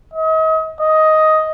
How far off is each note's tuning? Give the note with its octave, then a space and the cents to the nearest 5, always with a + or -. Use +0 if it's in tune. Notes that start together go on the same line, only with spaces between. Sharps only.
D#5 +40
D#5 +10